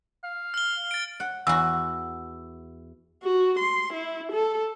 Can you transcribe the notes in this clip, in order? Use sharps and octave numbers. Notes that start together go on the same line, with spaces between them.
F5
F6 G7
A6 D7
F#5
E2 F#4 E6
F#4
C6
E4
A4